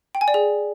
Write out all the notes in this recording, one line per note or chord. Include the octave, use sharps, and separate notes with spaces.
G5
G#5
D5
G#4